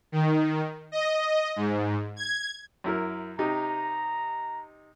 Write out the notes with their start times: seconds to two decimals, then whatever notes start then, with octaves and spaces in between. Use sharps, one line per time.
0.12 D#3
0.92 D#5
1.56 G#2
2.16 G#6
2.84 F#2 E4 A#4
3.39 C3 D#4 G4 A#5